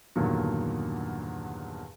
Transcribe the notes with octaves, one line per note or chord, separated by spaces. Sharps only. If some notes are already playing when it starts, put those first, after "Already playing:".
E2 G2 A#2 D3 D#3 F#3